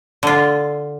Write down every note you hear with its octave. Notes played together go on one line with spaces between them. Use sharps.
D3 F4